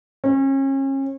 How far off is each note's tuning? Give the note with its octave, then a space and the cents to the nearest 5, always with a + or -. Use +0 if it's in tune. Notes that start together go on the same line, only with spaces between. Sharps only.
C#4 -35